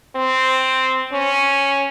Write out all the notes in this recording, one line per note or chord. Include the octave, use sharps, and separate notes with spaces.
C4
C#4